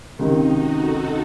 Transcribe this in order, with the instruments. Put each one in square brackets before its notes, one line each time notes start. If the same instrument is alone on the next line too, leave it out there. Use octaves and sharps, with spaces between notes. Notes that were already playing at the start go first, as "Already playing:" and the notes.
[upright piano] C#2 C3 D#3 [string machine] D#4
[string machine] F#4
A4